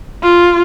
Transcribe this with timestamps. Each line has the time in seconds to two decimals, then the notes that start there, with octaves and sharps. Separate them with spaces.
0.23 F4